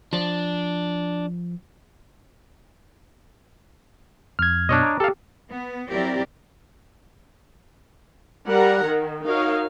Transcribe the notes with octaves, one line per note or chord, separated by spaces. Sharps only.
F3 D4
F2 F6 G#6
F#2 B2 D4 C#5 D#5
A#5 D6
G4 A4 F5
B3
F#3 C4 E4 G4 A#4 D5
G3 A#4 F#5 A#5
D#3
D#4 F#4 A#4 C#5 F5